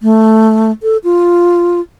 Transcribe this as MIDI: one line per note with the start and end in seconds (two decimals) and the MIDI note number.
0.02 0.72 57
0.83 0.97 69
1.04 1.80 65